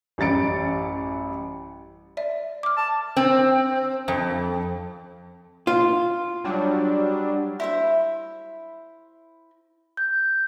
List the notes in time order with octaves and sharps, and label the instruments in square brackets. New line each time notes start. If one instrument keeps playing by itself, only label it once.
[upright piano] A1 F#2 G3 A6 C#7 D7
[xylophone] D5 E5
D6 F6
[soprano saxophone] A5
[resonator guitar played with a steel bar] C4
F2
[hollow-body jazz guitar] F4
[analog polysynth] F#3 G3 D4
[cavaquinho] E4 C5 E5
[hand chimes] G6